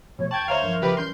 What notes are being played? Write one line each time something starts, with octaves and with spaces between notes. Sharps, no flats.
B2 F3 A3 C#5
E2 G5 A5 C#6 G#6 F#7
D2 C5 C#5 E5 F5 A#5 F7
G2 F3 A#4
C#2 D#3 F3 G4 B4
E3 G3 C#4 C6 G6 C7